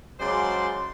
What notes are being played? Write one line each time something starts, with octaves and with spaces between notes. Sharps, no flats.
C#3 F#3 G#3 C5 D5 C6